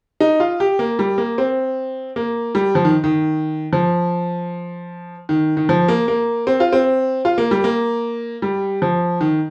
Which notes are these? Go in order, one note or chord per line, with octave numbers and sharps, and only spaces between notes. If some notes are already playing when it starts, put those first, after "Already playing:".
D#4
F4
G4
A#3
G3
A#3
C4
A#3
G3
F3
D#3
D#3
F3
D#3
D#3
F3
A#3
A#3
C4
F4
C4
F4
A#3
G3
A#3
G3
F3
D#3